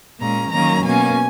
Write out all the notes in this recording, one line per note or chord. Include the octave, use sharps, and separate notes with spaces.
A#2 G#3 C#4 A#5
D#3 F#3 A#3 C#4 A#5
B2 A#3 C#4 G#5